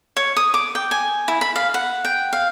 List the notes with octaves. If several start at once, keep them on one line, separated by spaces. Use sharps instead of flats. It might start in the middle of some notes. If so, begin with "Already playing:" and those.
C#5
D#6
D6
G5
G#5
E4
B5
F5
F#5
G5
F5